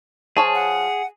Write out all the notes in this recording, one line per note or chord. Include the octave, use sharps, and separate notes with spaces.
F3 G#4 C#5 A5
F#5